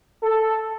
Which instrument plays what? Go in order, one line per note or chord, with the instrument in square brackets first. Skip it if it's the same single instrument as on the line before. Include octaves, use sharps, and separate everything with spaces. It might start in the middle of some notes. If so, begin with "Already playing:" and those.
[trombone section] A4